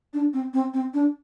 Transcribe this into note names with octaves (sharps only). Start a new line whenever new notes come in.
D4
C4
C4
C4
D4